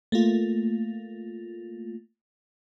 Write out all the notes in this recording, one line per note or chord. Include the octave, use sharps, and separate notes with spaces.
A3 A#3 F4